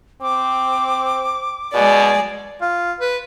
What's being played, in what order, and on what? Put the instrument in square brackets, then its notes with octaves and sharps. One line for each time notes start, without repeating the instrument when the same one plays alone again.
[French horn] C4 [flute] D6
[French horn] B2 [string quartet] G#3 G#4 D5
[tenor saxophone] F4
B4